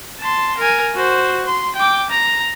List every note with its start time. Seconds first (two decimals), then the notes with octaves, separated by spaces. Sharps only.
0.20 A5 C6
0.58 A#4 G#5
0.94 F#4 C5
1.46 C6
1.76 G5 D6
2.10 A#5